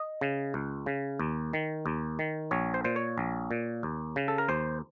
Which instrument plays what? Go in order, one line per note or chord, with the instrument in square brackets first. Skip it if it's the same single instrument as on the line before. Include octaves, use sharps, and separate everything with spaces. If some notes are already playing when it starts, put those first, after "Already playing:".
Already playing: [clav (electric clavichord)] D#5
C#3
C#2
C#3
D#2
D#3
D#2
D#3
A#1 C#5
C5
A#2 C5
C#5
A#1
A#2
D#2
C#3
A4
A#4
D#2 C5